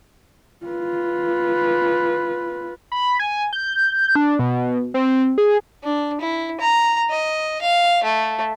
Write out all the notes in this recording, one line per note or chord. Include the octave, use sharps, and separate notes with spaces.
F4 B4
B5
G#5
G6
D4
B2
C4
G#4
D4
E4
A#5
D#5
F5
A3